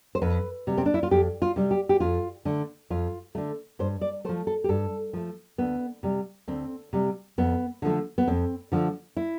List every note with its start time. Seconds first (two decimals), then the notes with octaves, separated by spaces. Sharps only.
0.15 C5
0.22 F2 B4
0.67 C3 G3
0.78 C4
0.86 D4
0.94 E4
1.03 F4
1.11 F2 G4
1.42 F4
1.56 C3 G3
1.71 G4
1.89 G4
2.00 F2 F4
2.45 D3 A3
2.90 F2 F4
3.35 D3 A3
3.79 G2 C5
4.01 D5
4.24 A3 C5
4.29 F3
4.47 A4
4.64 G4
4.69 G2 A4
5.13 F3 A3
5.58 D2 B3
6.03 C3 G3
6.48 D2 C4
6.93 C3 G3
7.38 F2 B3
7.82 D3 F3 A3
8.18 B3
8.28 F2 C4
8.72 D3 F3 A3
9.17 E4